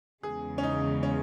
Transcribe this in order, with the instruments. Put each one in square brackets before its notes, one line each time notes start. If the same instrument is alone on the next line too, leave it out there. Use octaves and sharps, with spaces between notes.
[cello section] E2 C#3 G#3 [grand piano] G#4
[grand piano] C#4
D#4
C#4